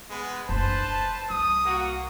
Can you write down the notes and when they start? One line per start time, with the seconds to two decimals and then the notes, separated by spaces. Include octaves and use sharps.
0.10 G#3 B3 B4
0.49 F#1 D4 B4 C5 A5
0.84 D#1
1.30 C2 D#6
1.65 A#3 F#4